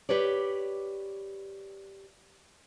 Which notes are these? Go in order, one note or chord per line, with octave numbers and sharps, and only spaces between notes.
G4 B4 C#5 D5